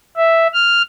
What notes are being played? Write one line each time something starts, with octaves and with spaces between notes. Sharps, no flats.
E5
F6